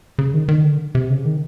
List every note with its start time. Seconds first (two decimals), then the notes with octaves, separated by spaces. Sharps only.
0.19 C#3
0.34 D#3
0.48 D#3
0.64 D3
0.95 C3
1.10 C#3
1.25 D#3